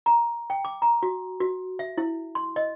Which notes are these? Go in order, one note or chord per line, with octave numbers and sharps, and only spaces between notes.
A#5
G5
D6
A#5
F#4
F#4
E5
E4
C6
D#5